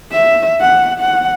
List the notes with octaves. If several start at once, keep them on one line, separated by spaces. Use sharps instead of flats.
E5
F#5
F#5